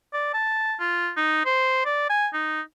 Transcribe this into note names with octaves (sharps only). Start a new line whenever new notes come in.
D5
A5
F4
D#4
C5
D5
G#5
D#4